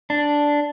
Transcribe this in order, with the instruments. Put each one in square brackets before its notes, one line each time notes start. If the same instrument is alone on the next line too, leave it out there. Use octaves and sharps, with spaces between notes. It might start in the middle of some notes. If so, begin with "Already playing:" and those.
[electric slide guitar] D4